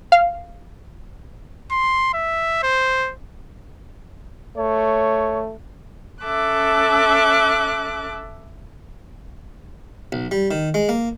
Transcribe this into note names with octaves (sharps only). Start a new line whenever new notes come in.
F5
C6
E5
C5
A3 C#5
C#4 A4 E5 D6 F#6
B1
G3
D#3
G#3
A#3